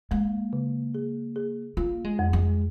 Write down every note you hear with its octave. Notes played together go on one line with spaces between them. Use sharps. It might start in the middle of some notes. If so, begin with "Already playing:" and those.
G#3 A#3
C#3
G#4
G#4
A#3 F4
G#3
F2
G#3